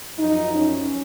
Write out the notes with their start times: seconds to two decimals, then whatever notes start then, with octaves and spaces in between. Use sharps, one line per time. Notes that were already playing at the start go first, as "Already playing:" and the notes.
0.17 F#2 F3 D#4
0.55 C#4